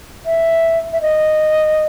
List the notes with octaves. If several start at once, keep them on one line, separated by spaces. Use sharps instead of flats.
E5
E5
D#5